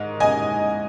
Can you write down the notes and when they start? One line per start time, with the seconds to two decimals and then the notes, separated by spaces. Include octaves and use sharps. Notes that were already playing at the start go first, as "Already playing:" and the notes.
Already playing: G#2 D#3 D#5
0.20 D#5 G#5